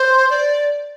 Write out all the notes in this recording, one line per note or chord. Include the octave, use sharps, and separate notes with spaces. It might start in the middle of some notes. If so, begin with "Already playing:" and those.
Already playing: C5
D5